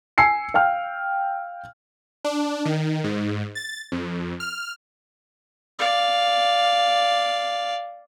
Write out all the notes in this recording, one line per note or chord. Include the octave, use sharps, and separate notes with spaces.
G#5 E6 C7 C#7
F5 G5 F6
D4
D#3
G#2
A6
F2
F6
D5 F5